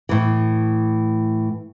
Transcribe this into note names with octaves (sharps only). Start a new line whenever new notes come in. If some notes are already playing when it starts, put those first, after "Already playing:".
A2 E3